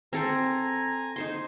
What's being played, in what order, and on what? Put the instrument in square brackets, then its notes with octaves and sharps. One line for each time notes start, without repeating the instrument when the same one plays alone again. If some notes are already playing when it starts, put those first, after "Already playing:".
[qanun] C4 A4 C5 [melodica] G#5 A#5
[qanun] D#4 C5 C6